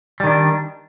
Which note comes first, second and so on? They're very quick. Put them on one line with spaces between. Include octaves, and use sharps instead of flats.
G3 D#3 D4